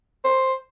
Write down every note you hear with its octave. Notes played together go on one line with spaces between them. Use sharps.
C5